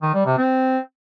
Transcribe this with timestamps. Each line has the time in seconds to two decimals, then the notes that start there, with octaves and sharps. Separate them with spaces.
0.02 D#3
0.14 G3
0.26 C3
0.38 C4